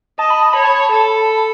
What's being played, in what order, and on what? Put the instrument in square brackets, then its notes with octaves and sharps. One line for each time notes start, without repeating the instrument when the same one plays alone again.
[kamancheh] D#5 [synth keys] A5
[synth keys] B5
A5
[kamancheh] C#5 [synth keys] B5
[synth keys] A5
[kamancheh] A4 [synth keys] A5